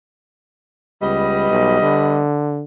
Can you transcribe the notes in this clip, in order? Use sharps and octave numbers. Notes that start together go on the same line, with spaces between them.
C#2 G3 B3 D#5
B1
D3